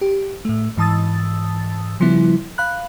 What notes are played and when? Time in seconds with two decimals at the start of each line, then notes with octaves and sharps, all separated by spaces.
0.01 G4
0.45 A2 A3
0.77 G#2 E3 A5 D#6 E6 A6
2.00 C#3 F3 G3 B3 E4
2.58 F5 B5 F#6